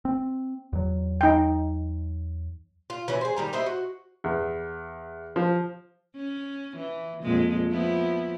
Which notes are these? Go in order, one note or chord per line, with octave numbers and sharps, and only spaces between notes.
C4
E2 F#3
D#4 G5
F4
E3 F#3 C#4
G#4 C5
D#3 G3 A#5
E4 C5 D#5 E5
F#4
E2
F3
C#4
E3
F2 A#2 G#3
F3 B3 E4